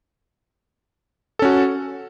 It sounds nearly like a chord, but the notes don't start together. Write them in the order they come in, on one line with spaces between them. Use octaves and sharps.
A4 C#4 F#4